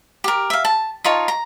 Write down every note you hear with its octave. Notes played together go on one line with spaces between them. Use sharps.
G4 A#4
E5 F5
A5
D#4 F4 C#5 A5
A#5